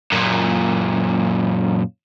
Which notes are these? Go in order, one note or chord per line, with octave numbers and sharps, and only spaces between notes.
F#2 A#2